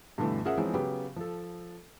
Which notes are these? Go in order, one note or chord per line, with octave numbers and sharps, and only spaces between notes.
G2 B2 D3 E3 A3
C#4 F4 G#4 A#4 E5 F#5
E3 F3 G#3 C4 C#4 D#4
C#3 F#3 B3 G4
F3 A4